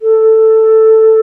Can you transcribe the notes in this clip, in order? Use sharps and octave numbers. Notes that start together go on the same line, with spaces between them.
A4